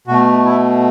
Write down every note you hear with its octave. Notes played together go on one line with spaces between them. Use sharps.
B2 A3 F#4
E4